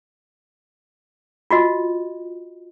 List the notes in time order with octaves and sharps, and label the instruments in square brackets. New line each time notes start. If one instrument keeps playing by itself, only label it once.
[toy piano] F4 F#4 D#5